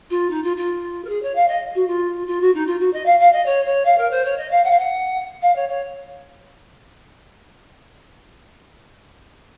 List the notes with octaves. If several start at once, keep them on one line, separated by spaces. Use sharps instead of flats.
F4
D#4
F4
F4
A#4
G#4
C#5
F5
D#5
F#4
F4
F4
F#4
D#4
F4
F#4
D#5
F5
F5
D#5
C#5
C#5
F5
A#4
C5
C#5
D#5
F5
F#5
F5
F#5
F5
C#5
C#5